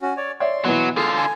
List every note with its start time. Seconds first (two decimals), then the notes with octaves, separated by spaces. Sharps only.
0.02 C#4 F#4
0.17 C#5 D5
0.40 C#5 D5 E5 C6
0.65 B2 E3 F#3
0.97 D3 F4 G#4 A4
1.17 G#5